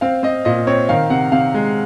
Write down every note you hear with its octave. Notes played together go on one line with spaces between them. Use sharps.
C4 F5
C4 D#5
A#2 D#5
C4 C#5
D#3 F5
C3 F#5
C3 F5
G#3